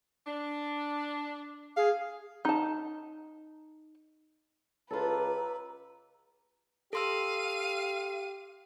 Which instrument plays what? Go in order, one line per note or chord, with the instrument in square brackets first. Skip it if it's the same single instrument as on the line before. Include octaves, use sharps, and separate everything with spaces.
[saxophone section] D4
[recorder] G#4 [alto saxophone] F5
[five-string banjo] D#4 A5
[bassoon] C#2 [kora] F4 A4 [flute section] G4 A#5 E6 [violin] B4
[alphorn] G4 [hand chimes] A4 C6 E6 [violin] F5 D#7